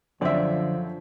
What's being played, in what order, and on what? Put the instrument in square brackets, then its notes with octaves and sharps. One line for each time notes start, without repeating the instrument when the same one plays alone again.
[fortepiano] F#2 C4 E5 [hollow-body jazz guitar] D3 D5 [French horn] F3